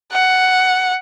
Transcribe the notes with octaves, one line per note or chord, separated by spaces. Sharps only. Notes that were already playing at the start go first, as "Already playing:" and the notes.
F#5